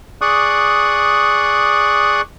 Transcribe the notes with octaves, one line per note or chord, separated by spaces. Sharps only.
G#4 D5 C#6 D#6 F#6